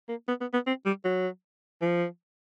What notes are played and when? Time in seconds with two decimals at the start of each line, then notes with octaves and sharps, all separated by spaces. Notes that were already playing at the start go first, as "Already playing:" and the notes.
0.09 A#3
0.28 B3
0.41 B3
0.53 B3
0.67 C4
0.86 G3
1.05 F#3
1.82 F3